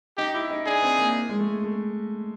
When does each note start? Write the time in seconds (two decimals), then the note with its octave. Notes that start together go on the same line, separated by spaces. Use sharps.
0.18 D#4 G4
0.34 E4
0.50 D#4
0.66 D4 G#4
0.83 C4
0.98 A#3
1.29 G#3
1.39 A3
1.64 A3